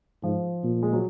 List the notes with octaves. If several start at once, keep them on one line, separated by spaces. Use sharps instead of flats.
G#2 F3
A#2
G#3
F#3